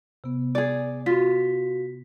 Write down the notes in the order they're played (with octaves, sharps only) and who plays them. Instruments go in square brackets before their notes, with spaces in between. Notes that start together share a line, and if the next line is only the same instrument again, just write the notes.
[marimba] C3 B3
[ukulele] G#4 D5
[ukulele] F4 [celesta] F#4 B6